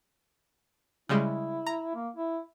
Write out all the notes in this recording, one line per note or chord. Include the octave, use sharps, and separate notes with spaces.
C#3 G3 G#3 E4
A#5
A#3
E4